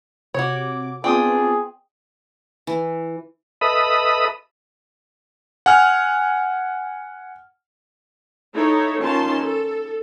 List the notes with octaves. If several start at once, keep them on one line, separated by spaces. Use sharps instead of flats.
C3 F#4 C#5 D6
B3 C4 D4 F4 G#4 G5 C6 D#6
E3
A4 B4 D#5 E5 B5 D#6
F#5 G#5 F6
D#4 E4 A4 C#5
D#3 C#4 F4 A5 C6
A4